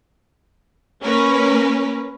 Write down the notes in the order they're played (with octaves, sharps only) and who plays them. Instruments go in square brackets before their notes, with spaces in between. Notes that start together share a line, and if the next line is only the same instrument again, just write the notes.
[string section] A#3 C#4 A#4 B4